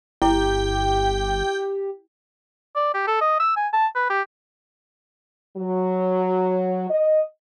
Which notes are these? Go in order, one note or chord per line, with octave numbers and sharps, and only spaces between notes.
G1 E4 G4 G5
D5
G4
A4
D#5
E6
G#5
A5
B4
G4
F#3
D#5